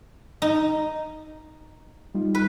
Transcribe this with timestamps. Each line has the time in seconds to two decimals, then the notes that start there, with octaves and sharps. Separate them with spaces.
0.42 D#4
2.14 G3 D#4 F4
2.35 B4